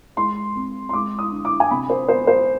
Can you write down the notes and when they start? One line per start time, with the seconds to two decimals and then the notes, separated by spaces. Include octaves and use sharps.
0.17 G#3 C6
0.56 C4
0.89 C6
0.93 G#3 D6
1.18 D#6
1.32 D3
1.45 D6
1.60 G#5
1.71 C3 B5
1.90 C5
2.08 B3 C5
2.27 C5